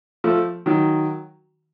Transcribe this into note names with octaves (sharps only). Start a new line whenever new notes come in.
F3 A3
D#3 F#3